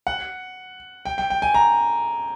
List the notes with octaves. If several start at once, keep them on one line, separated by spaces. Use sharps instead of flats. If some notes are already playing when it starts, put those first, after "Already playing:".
F#5
G5
G5
G5
G#5
A#5